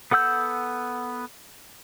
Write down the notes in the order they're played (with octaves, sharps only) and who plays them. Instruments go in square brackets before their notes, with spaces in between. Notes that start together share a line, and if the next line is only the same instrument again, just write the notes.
[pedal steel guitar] B3 A4 F#5 E6 G6